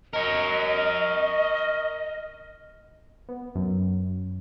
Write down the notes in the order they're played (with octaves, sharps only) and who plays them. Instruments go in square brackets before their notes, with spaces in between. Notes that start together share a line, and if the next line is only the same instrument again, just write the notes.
[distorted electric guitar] A#4 C#5 [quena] D#5
[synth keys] B3
F#2